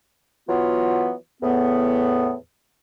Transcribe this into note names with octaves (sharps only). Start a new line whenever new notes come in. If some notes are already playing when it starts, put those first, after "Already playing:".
E3 F#3 B3 F4
E2 A2 B3